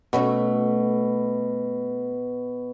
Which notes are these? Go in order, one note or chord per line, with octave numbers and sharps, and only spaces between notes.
B2 A3 C#4 F#4